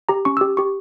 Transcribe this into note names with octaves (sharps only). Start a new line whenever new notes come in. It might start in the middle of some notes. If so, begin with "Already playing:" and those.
G4 A#5
C#4 C#6
G4 E6
G4 C#6